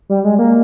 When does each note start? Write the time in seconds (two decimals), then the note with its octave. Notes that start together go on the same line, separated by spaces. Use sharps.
0.09 G3
0.24 G#3
0.39 A#3